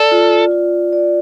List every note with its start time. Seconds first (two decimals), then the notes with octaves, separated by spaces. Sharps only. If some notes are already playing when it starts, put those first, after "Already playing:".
Already playing: A4 D5
0.12 F4
0.51 F4
0.93 D5